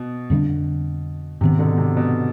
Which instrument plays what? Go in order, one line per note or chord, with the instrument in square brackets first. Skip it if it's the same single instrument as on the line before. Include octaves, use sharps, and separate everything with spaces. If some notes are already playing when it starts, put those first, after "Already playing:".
Already playing: [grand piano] B2
[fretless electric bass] F2 D3 G3 D4
[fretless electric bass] G#2 D#3 B3 [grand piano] C3
[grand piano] B2 D3
C3
B2